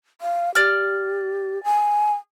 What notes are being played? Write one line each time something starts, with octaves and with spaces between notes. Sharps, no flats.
F5
G4 D5 F6
G#5